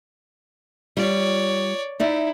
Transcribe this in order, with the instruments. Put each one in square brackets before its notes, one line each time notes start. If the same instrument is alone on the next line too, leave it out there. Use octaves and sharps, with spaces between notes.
[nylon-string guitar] G3 F4 [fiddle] C#5 D5
[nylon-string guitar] D#4 D5 E5 [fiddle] E4